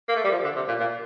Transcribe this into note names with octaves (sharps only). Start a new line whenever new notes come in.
A#3
A3
G3
F3
D3
C3
A#2
A#2